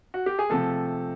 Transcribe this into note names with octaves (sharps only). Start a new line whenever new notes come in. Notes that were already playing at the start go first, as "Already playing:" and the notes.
F#4
G4
G#4
C3 F3 A3 A4